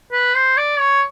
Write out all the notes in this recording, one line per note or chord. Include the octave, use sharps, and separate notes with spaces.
B4
C5
D5
C#5